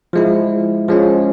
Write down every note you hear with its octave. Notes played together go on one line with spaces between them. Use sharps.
F3 G#3 E4
F3 G#3 C#4